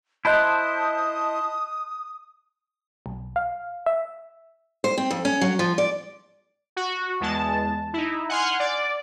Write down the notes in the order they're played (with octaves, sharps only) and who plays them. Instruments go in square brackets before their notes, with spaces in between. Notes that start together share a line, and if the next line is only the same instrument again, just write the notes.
[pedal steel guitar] E4 C5 [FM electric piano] D#5 A5 [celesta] B5 F#6 G6 [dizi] D#6
[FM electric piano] B1
F5
E5
[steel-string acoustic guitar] C5
C4
F2
C#4
F#3
F3
D5
[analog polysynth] F#4
E2 G#3 A5
D#4 E4
F#5 G#5 C6 F6
D5